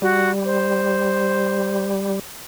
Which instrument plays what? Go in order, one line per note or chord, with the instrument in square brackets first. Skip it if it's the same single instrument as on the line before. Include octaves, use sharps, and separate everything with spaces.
[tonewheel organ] G3 [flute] F#4
[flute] C5